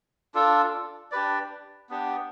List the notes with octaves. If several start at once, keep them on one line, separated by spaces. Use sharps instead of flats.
D4 F4 A4
D4 G4 B4 D5
B3 D4 G4